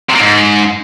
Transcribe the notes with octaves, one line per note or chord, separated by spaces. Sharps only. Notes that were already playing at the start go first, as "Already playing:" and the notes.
C3
A#3
G#2